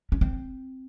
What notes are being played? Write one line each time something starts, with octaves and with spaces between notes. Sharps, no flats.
C#4
C4